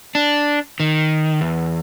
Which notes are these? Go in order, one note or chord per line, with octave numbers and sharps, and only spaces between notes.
D4
D#3
E2